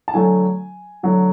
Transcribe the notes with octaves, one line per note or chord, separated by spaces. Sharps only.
A5
D3 F#3 A3 G#5
D3 F#3 A3